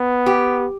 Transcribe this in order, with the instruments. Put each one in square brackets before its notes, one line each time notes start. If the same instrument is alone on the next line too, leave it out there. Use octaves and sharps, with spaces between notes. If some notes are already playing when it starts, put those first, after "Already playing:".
Already playing: [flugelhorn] B3
[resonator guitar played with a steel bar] G4